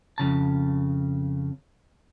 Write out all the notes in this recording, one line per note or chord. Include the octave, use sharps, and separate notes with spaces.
F2 C#3 A5